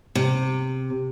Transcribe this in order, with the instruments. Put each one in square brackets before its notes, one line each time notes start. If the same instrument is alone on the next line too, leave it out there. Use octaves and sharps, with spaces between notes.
[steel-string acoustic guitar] C3